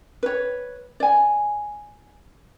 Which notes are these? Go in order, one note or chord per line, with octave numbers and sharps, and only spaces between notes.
B4 C#5
D5 G#5